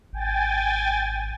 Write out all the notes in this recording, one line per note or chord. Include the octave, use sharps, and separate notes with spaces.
G#1 G5 G#5 A6